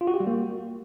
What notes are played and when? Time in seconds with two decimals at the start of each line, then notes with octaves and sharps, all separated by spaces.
0.01 F4
0.07 F#4
0.14 G4
0.20 G3
0.27 A#3